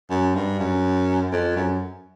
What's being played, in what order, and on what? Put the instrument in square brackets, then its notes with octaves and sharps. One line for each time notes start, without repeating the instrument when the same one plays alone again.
[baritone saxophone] F#2
G2
F#2
F2
F#2